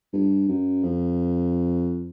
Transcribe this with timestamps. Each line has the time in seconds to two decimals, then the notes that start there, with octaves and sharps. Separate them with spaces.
0.13 G2
0.49 F#2
0.84 F2